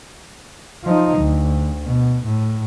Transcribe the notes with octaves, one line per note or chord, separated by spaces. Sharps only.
F3 D#4
D2
B2
A2